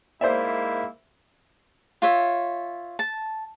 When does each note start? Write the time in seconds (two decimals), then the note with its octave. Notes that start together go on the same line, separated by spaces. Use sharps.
0.21 G#2 A#3 E4 C5 D5 E5
2.02 F4 C#5 E5
2.99 A5